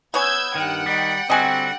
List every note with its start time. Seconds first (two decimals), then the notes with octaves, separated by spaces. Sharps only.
0.14 B3 C#5 G#5 E6 G6 G#6
0.55 G2 D#3 F#5 G5
0.86 D#3 G3
1.30 D3 G3 C4 F#4 D#5 G#5